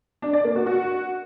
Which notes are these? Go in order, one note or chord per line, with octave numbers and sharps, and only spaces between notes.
D4
D5
A#3
F#4
F#4